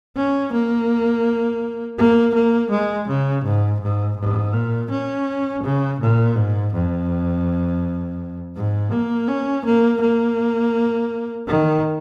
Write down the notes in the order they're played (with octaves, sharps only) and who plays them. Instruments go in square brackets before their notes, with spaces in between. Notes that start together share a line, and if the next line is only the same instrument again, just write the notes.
[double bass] C#4
A#3
A#3
A#3
G#3
C#3
G#2
G#2
G#2
A#2
C#4
C#3
A#2
G#2
F2
G#2
A#3
C#4
A#3
A#3
D#3